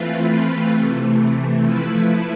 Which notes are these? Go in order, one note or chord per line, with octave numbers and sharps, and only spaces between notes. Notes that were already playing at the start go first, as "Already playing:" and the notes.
Already playing: E3 A3 C4 F4 B4
C3 E3 A3
F3 A3 E4 B4